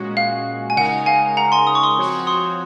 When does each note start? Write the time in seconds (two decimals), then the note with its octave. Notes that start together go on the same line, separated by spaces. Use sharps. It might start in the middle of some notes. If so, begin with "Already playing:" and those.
Already playing: A#2 G#3 C#4 F#4
0.17 F5
0.70 G#5
0.76 C#3 G#3 D#4 A#4 F#5
1.06 F5 G#5
1.37 F#5 A#5
1.52 G#5 C6
1.67 D#6
1.75 C#6
1.83 C6 D#6
1.97 F3 C4 F#4 C#5
2.27 C6 D#6